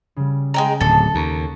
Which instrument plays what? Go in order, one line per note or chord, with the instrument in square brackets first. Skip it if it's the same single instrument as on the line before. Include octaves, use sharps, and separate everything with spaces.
[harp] C#3 G3
[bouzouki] G#3 G5 A#5
[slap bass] D1 [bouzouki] A4
[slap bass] D#2 [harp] A#5 C#6